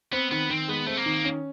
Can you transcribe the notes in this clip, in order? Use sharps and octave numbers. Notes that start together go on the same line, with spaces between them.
B3 C4
D#3 B3
D#3 C4
G#3 B3
A3 C4
A#3
D#3
C#4